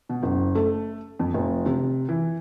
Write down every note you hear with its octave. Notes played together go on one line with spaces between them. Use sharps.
B2
F#1
A3
F2
F1
C3
E3